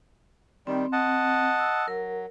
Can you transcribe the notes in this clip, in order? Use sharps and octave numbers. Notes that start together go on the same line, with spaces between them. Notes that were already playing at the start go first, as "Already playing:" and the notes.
D#3 G3 C4
D#5 F#5 A5
E6
F#3 A#4